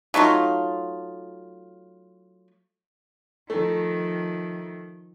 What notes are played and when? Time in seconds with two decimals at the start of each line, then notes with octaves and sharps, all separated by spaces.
0.14 F#3 A3 D#4 F4
3.50 D#3 F3 A3